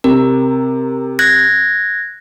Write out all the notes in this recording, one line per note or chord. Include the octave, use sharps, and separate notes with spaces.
C3 A#4
F#6 G#6 A#6